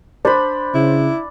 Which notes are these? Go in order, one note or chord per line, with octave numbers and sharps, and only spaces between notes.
D4 C5 B5
C#3 E4